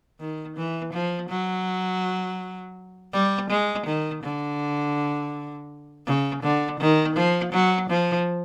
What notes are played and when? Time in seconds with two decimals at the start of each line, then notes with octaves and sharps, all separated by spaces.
0.20 D#3
0.56 E3
0.93 F3
1.29 F#3
3.13 G3
3.50 G#3
3.86 D#3
4.23 D3
6.06 C#3
6.43 D3
6.80 D#3
7.16 F3
7.52 F#3
7.89 F3